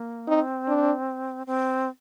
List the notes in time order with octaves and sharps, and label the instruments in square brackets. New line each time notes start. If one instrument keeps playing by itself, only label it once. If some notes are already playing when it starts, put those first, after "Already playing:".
Already playing: [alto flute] A#3
[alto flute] C4 [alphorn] D#4
[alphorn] D4
[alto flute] C4